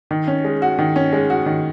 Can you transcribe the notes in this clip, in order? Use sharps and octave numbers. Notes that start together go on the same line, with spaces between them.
D#3
C#4
G#3
F#4
D#3
C#4
G#3
F#4
D#3